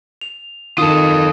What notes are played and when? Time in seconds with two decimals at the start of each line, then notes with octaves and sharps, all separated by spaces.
0.21 F7
0.78 D#3 F4 A4 D#6